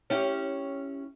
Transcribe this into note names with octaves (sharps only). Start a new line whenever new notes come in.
C#4 E4 G4